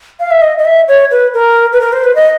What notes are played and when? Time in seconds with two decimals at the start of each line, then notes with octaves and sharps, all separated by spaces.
0.20 F5
0.31 E5
0.42 D#5
0.58 D#5
0.65 E5
0.88 C#5
1.11 B4
1.34 A#4
1.73 B4
1.81 A#4
1.93 C5
2.04 B4
2.15 D#5